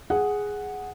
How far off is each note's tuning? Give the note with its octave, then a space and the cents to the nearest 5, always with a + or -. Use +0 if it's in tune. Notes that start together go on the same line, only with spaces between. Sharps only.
G#4 +0 F#5 +0